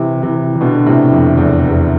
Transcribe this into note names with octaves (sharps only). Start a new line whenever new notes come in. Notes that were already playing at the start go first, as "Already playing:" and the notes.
Already playing: C3 E3
C3 E3
E3
B2 D3
D3
A2 C3
F2
E2
E2